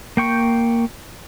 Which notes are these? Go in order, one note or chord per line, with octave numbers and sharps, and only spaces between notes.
A#3 G5 C#6 G6